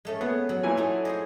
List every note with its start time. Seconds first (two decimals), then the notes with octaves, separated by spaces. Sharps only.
0.05 G#3 A3 C#4
0.21 B3 G#4
0.49 F#3
0.63 A#2 E3 G#5
0.77 A3 D#4
1.05 G#4 C5 D#5